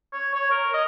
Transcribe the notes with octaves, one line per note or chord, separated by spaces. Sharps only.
C#5
C#5
A#4
D#5